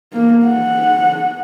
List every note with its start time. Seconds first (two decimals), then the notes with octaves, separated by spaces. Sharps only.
0.13 A#3
0.46 F#5